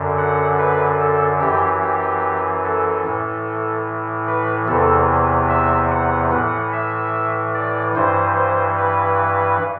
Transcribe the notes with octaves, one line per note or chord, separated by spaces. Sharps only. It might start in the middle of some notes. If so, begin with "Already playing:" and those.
Already playing: F#2 D3
F#5
B4
A4
F#2 E3 G4
G4
A4
A2 E3
B4
E2 C3 E3 A4
E5
F#5
A2 E3 F#5
E5
D5
G2 E3 C5
C5
B4